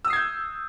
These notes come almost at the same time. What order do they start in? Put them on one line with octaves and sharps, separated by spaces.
E6 D#6 C7 G#6 G6